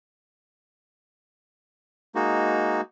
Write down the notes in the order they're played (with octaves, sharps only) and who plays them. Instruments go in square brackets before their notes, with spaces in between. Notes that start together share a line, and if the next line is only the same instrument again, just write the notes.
[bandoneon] G#3 A#3 D#4 F#4